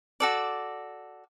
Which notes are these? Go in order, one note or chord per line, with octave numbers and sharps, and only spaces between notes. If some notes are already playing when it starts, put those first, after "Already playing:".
F#4 A4 D5